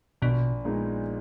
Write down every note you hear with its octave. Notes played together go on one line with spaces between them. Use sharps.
A#1 B2
A#2 G#3 B3 D#4